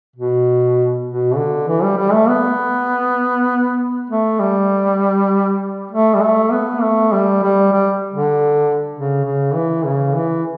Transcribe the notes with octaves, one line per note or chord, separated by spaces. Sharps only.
B2
B2
D3
E3
G3
G3
A3
B3
A3
G3
A3
G3
A3
B3
A3
G3
G3
G3
D3
C#3
C#3
E3
C#3
E3